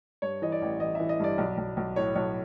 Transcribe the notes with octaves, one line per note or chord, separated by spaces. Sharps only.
G2 C#5
E3 D#5
D5
A1
A1 D#5
E5
E3
D#5
G2 D5
B1
B1
B1
A2 C#5
B1 C#5